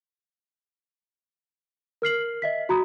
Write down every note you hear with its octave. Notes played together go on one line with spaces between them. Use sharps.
A#4 F6 C7 F#7
D#5 E5 B6
F#4 A#5 B5 D#6